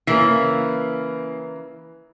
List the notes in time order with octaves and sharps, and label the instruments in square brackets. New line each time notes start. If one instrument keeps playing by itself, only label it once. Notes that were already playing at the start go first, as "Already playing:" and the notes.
[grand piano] C#3 A#3 C7 [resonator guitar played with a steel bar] E3